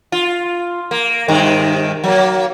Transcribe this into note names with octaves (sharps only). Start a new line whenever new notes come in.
F4
A#3
G2 C3 D#3
F#3 A#3